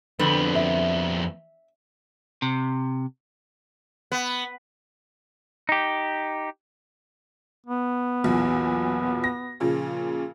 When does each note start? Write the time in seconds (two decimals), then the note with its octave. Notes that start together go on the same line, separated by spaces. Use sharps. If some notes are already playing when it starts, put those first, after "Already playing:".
0.19 F2 D3 B3 C4 B4
0.55 E5
2.42 C3
4.12 B3
5.69 D#4 G4
7.66 B3
8.24 B1 E2 A#2
9.24 A#6
9.60 A#2 C#3 F3